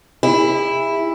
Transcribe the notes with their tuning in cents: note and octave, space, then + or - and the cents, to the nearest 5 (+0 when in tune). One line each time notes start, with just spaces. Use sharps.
E4 +0 G#4 -45